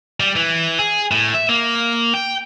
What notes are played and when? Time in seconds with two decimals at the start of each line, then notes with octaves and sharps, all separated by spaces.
0.20 G3
0.36 E3
0.79 G#4
1.12 A2
1.34 E5
1.49 A#3
2.14 G5